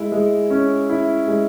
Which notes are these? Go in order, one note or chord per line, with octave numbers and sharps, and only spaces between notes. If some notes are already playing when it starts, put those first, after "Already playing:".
Already playing: G#3 E4
G#3
C#4
E4
G#3